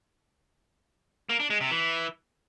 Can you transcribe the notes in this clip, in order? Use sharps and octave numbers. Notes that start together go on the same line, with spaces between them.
A#3
D4
G#3
C3
E3